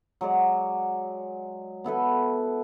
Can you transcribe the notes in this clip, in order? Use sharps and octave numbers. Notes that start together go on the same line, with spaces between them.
F#3 G#3 D5
B3 E4 A4 B4